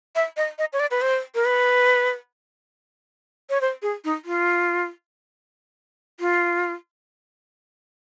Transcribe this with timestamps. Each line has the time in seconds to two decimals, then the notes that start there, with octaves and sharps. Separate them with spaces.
0.15 E5
0.37 D#5
0.58 D#5
0.73 C#5
0.80 D5
0.91 B4
1.01 C5
1.35 A#4
1.45 B4
3.50 C#5
3.61 C5
3.82 G#4
4.05 D#4
4.25 F4
6.20 F4